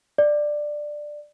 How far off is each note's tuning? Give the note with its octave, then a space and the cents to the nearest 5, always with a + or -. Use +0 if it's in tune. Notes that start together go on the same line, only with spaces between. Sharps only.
D5 +10